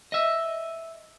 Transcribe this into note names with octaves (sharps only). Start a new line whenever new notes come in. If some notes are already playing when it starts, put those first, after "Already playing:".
D#5 E5